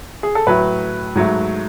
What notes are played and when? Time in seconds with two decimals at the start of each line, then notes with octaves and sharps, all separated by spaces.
0.23 G#4
0.35 A4
0.47 A2 F#3 A3 B4
1.15 G#2 F#3 A3